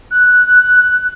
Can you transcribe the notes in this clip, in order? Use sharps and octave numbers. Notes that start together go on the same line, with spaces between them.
F#6